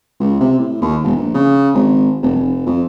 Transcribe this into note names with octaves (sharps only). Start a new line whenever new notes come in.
C#2
C3
A2
D#2
E1
A#1
C#3
G#1
F1
F1
F2